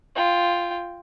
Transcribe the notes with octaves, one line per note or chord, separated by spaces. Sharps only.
F4 G5